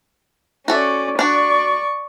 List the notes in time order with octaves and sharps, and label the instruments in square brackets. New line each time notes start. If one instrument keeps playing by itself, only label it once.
[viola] C#4 D5 [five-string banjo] F#4 A4 E5
[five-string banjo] D4 F#4 [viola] D5 C#6